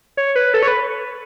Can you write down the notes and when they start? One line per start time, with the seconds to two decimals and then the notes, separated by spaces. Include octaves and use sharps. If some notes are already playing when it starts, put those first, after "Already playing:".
0.17 C#5
0.36 B4
0.54 A4
0.63 C#5
0.68 B4